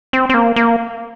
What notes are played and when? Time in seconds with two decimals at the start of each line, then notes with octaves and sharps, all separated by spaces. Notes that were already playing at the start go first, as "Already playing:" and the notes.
0.13 C4
0.29 C4
0.34 A#3
0.56 A#3